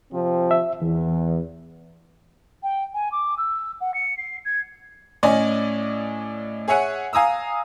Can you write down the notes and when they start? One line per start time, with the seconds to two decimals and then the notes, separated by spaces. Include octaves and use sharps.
0.12 C3 F3 C4
0.51 E5
0.82 E2 E3
2.63 G5
2.94 G#5
3.12 D6
3.38 E6
3.81 F#5
3.94 C#7
4.18 C7
4.45 G#6
5.23 A2 C#4 D5 D#5 G#5
6.68 G#4 C#5 E5 F#5 G#5
7.13 F5 G#5 A#5 D#6 E6